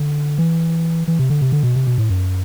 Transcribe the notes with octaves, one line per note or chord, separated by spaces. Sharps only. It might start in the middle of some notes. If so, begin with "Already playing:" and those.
Already playing: D3
E3
E3
C3
D3
C3
D3
B2
C3
B2
A2
F#2